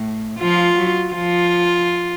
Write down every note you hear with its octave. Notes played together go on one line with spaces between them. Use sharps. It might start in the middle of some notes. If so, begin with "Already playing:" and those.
Already playing: A2
F3 F4
F#3
F3 F4